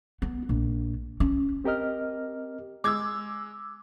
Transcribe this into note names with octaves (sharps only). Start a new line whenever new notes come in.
B3
A#1
C#4
C4 G4 A#4 D#5 F6
G#3 D6 E6 G#6